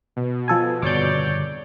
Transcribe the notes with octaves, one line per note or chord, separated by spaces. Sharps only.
B2
F3 A4 G#5
G1 F2 C#3 C#5 D5 D6 G6